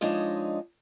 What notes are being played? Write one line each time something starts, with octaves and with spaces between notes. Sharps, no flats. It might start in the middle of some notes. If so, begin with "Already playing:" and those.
F3 G#3 D4 D#4 C#5 D#5